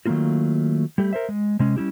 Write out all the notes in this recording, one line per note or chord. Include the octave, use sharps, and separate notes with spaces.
D#3 F#3 A3 A#3 F4 F#4
G3 A3 G4
A#4 C5 E5
G#3
C3 G#3 C#4
G3 C#4 E4 G4